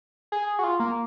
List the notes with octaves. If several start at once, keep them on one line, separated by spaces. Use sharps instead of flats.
G#4
F#4
F4
A#3